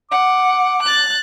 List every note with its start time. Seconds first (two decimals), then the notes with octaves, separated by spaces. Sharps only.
0.12 F#5 D6
0.83 F#6 A6